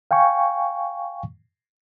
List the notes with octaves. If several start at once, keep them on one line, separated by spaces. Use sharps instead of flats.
F5 G5 G#5 C#6